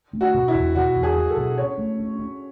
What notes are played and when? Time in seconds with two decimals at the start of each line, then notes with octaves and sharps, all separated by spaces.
0.13 A3
0.21 F#4
0.34 B2
0.48 E4
0.55 E2
0.75 B2 F#4
0.96 E2
1.03 G#4
1.16 F#3
1.30 A4
1.37 B2
1.57 C#4 C#5
1.78 A3
2.00 C#4
2.19 C#4